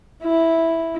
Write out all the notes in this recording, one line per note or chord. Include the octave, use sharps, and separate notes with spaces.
E4